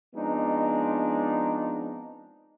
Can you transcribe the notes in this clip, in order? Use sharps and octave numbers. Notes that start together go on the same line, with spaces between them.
F3 G#3 B3 C4 D4 D#4